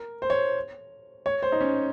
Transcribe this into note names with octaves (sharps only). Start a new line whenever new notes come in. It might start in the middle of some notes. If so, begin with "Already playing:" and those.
Already playing: A#4
C5
C#5
C#5
C5
D#4
C#4